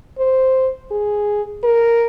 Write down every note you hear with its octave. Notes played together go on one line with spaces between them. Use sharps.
C5
G#4
A#4